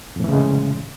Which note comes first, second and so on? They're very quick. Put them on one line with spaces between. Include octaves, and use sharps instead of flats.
F2 A2 E3 C#3 G#3